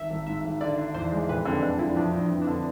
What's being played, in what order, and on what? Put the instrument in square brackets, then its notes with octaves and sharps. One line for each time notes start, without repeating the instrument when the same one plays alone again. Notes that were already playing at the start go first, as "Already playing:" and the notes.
Already playing: [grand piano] G#1 [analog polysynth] E5
[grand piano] G#1
[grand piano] G#2 [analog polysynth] E5
[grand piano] G#1
[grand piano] D3 [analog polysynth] D5
[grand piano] D4
[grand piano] E2 [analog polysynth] C5
[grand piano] G#3
[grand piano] F1 [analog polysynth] B4
[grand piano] D3 [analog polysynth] C4
[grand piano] D3 [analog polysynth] D4
[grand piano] F3 [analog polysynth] E4
[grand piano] F2 [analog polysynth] D4
[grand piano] F2
[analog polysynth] C4
[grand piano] F2
[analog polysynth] D4
[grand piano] D3